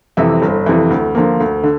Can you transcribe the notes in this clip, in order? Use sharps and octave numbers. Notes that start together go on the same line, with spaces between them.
F2 C3 E3 E5
G1 C5
F2 C3 E3
D2
D3 F3 A#3
D2
D3